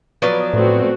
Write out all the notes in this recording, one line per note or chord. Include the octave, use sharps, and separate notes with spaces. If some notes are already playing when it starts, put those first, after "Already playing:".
F3 F#3 B3 B4 D5
A2 A3 C4 F#4